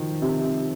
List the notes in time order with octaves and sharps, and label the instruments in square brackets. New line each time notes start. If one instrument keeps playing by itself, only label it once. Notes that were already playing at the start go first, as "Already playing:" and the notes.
Already playing: [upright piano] D#3 F3
C3